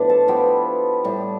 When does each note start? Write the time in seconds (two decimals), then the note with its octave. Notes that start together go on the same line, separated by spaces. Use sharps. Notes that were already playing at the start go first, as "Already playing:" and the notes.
Already playing: A2 F3 B3 D4 B4 D5
0.09 A4 A5
0.28 F3 B3 E4 G4 G5
1.04 A2 G3 D4